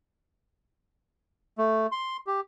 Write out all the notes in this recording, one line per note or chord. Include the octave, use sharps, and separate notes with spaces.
A3
C6
G4